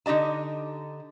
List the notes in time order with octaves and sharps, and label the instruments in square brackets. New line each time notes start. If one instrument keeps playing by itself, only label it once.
[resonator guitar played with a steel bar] D3 D#4 G4 D#5 A5